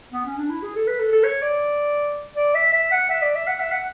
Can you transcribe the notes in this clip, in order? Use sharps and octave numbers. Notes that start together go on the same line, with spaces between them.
B3
C#4
D4
E4
G#4
A4
B4
A4
A4
C#5
D5
D5
E5
E5
F#5
E5
D5
E5
F#5
E5
F#5